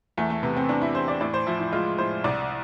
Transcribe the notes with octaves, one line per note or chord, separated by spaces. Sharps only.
E2 A3
A3
C3 B3
C4
E2 D4
E4
E2 C5
D5
A2 D5
C5
F3 E4
E4
G#3 F4
A2 C5
C2 D5